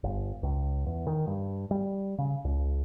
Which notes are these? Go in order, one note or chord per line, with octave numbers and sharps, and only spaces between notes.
G1
C#2
E2
D#3
G2
G3
C#3
C#2